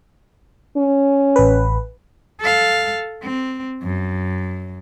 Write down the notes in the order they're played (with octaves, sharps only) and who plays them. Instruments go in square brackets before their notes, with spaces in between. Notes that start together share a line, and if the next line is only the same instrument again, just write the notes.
[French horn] C#4
[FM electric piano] A1 B4
[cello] A4 F5
C4
F#2